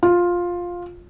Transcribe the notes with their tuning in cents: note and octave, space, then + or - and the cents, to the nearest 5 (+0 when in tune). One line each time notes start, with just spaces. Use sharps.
F4 +10